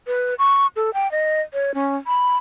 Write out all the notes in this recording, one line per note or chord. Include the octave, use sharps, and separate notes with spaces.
B4
C#6
A4
G5
D#5
C#5
C#4
B5